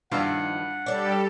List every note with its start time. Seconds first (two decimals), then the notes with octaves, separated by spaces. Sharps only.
0.12 G2 D#3 F3 E4 F4 F#5 E6
0.86 G3 D4 G4 A4 D5